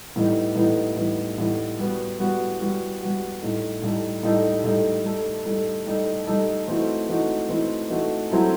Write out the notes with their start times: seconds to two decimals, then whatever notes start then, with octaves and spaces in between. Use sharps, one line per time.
0.16 A2 E3 G3 B3 D#4
0.56 A2 E3 G3 B3 D#4
0.96 A2 E3 G3 B3 D#4
1.38 A2 E3 G3 B3 D#4
1.79 G3 B3 F#4
2.19 G3 B3 F#4
2.60 G3 B3 F#4
3.00 G3 B3 F#4
3.42 A2 G3 D#4 A4
3.82 A2 G3 D#4 A4
4.23 A2 G3 D#4 A4
4.64 A2 G3 D#4 A4
5.04 G3 D#4 A4
5.46 G3 D#4 A4
5.87 G3 D#4 A4
6.27 G3 D#4 A4
6.67 E3 A3 C4 D#4 F#4
7.09 E3 A3 C4 D#4 F#4
7.49 E3 A3 C4 D#4 F#4
7.89 E3 A3 C4 D#4 F#4
8.31 F#3 C4 E4 A4